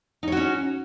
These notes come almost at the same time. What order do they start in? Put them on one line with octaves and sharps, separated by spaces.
D#4 C#5 F#4 C#4